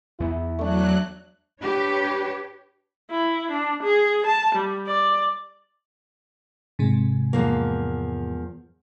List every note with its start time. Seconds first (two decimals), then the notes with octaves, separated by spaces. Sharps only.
0.20 E2 B3 E4
0.59 F#3 A3 D4 F#6
1.59 D4 G4 B4 C#5
3.10 E4
3.51 D4
3.84 G#4
4.27 A5
4.55 G3
4.87 D5
6.79 G#2 C3 G#3
7.33 E2 F3 A#3